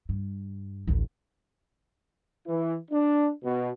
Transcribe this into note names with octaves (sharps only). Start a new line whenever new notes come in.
G2
A1 D2
E3
D4
B2